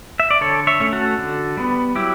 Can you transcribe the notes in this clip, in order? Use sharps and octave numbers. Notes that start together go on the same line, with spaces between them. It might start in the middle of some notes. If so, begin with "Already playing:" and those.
E5
D5
D3 A4 C#5
C#5 E5
A3 C#4
F#4 A4
D3
G3 B3
F#3 E4 G4